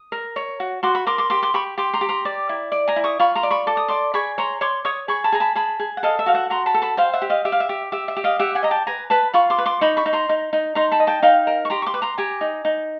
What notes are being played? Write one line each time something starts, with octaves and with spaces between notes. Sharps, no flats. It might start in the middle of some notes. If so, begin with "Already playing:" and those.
Already playing: D#6
A#4
C#5
F#4
F#4 C6 D6
B5 C#6
A#4 C6 D6
C6 D6
G4 C6 D6
C6 D6
G4 B5 C#6
G4 C6 D6
A#5 C6
G4
A#5 C6
D5
E4
D5
G#5 A#5
E4
C#6 D#6
F4 B5 C#6
A#5 C6
D5
B5 C#6
A4 D6
D#6
D5 C6 D6
G#4 B5 C#6
C#5 A#5 C6
C#5 C6 D6
C#5 C#6 D#6
G#4 B5 C#6
A5 B5
G#4 A#5
A5 B5
G#4 A5 B5
G#4
F#5
A4 D#5 F5
E5
F#4 F5
E5 F#5
F#4 A#5 C6
A5 B5
A4
A5 B5
C5 F5 G5
E5 F#5
G4
D#5 F5
G4 E5
F5
E5
G4
G4 E5
E5
G4
D#5 F5
G4 E5 F#5
F#5 G#5
D#5 A#5
G5 A5
B4 G#5 A#5
B4 A5 B5
F4 B5 C#6
C6 D6
B4
C6 D6
D#4 B5 C#6
B5 C#6
D#4
A#5 C6
D#4
D#4
D#4 A#5 C6
A5 B5
D#5
G5 A5
D#4 F5 G5
A#4
C#6
G4 A#5 C6
C#6
C6 D6
B4
A#5 C6
G4 G#5 A#5
D#4
D#4